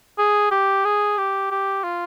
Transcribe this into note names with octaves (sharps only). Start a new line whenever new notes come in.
G#4
G4
G#4
G4
G4
F4